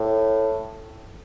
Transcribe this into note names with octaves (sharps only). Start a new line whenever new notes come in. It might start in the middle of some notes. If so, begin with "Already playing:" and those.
Already playing: A2